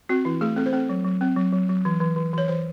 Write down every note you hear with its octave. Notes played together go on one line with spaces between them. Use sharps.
C4 F#4
E3 E4
A3 G#4
C4 A4
C5
C4 A4
F#3
F#3
C4
F#3
F#3
F#3
E3
E3
E3
E3 C#5
E3 C5